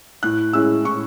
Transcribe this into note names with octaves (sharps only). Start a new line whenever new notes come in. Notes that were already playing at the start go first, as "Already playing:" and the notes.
A2 F#6
G#3 C#4 E4 E6
A2 C#6